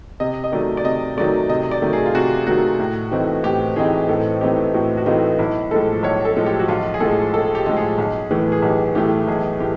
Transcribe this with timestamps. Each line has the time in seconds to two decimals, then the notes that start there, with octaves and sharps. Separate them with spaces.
0.20 C3 D#5
0.44 D#5
0.52 D#3 F#3 A3 D5
0.77 D5
0.85 C3 D#5
1.17 D#3 F#3 A3 D5
1.49 C3 D#5
1.71 D5
1.82 D#3 F#3 A3
1.93 G#4
2.06 F4
2.14 C3 F#4
2.47 D#3 F#3 A3 F#4
2.79 A2
3.11 E3 A3 C4 D#4
3.43 A2 G4
3.76 E3 A3 C4 D#4 G#4
4.08 A2 A4
4.41 E3 A3 C4 D#4 G4
4.74 A2 F#4
4.97 F#4
5.06 E3 A3 C4 D#4 F4
5.39 B1 E4
5.71 A2 F3 G#3 A4
6.03 B1 C#5
6.25 A4
6.36 A2 F3 G#3
6.46 G4
6.59 F#4
6.68 B1 F4
6.94 G#4
7.00 A2 F3 G#3 A4
7.33 B1 A4
7.55 G4
7.66 A2 F3 G#3
7.77 G#4
7.98 B1
8.31 A2 E3 A3
8.52 G#4
8.62 B1 G4
8.95 A2 E3 A3 G4
9.28 B1 G#4
9.60 A2 G4